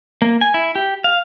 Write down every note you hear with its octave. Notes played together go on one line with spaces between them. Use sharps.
A#3
G#5
E4
G4
F5